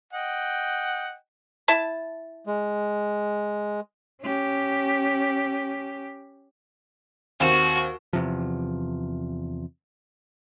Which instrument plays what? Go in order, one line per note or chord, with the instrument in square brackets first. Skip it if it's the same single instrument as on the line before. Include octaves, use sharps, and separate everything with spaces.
[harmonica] D#5 F#5 G5
[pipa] E4 A5
[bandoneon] G#3
[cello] C#4 G4
[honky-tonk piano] D#2 C4 E7 [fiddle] F#4
[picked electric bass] E2 C3 F3